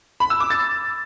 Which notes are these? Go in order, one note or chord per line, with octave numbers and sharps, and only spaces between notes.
B5
E6
D6
A6